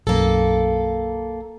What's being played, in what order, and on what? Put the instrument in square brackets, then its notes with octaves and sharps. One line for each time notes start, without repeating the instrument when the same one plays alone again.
[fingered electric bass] B1 F#2 [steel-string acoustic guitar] A#3 A4